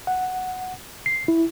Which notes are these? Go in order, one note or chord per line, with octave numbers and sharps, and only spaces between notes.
F#5
C7
E4